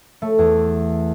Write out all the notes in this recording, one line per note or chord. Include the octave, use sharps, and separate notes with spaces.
A3
E2